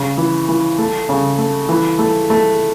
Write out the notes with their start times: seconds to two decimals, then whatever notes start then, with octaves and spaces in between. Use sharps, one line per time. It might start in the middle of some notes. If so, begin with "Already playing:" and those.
Already playing: C#3
0.18 E3
0.49 E3
0.78 A3
1.09 C#3
1.38 A3
1.69 E3
1.99 A3
2.30 A3